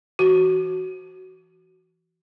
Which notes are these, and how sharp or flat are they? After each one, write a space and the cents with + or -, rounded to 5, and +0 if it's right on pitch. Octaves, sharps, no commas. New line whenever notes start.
E3 +20 F#4 +10